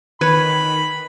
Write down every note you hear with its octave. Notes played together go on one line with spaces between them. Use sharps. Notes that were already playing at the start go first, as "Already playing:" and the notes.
D#3 B4 C#5 G#5 B5